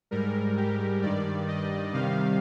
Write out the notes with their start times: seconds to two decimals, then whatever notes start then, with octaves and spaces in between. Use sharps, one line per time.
0.11 G#2 G3 A#4
0.57 G4
1.02 G2 D#3 G3 D5
1.48 D#5
1.93 C3 D#3 G3 F5